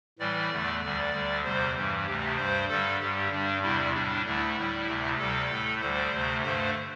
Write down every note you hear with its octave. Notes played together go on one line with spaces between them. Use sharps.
A2 E3 G3 D5
E2 D3 A3
D2 D3 G3 D5
D2 D3 G3
E2 C3 G3 C5
G2 E3 G3
D2 C3 A3 G4
G2 G3 C5
G2 D3 G3 A4
G2 D3 G3 G4
G2 G3 D4
E2 C3 G3 E4
A2 G3 D4
D2 D3 A3 E4
A2 G3
D2 C3 A3
D2 C3 G3 A4
A2 A3
D2 D3 G3 C5
D2 C3 A3
G2 D3 A3 C5